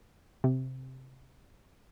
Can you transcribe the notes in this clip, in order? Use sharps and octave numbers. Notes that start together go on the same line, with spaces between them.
C3